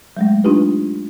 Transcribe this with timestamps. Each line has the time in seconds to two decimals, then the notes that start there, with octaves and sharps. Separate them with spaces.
0.17 F#3 G#3 A3
0.44 D4 D#4 F4 G4 B4